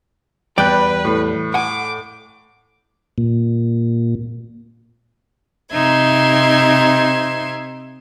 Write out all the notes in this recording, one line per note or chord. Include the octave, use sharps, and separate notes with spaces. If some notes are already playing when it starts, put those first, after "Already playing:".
E2 G3 B4 D5 G5 F#6
A2
F#5 G#5 D6
A#2
C3 C4 D#4 E5 C6 G#6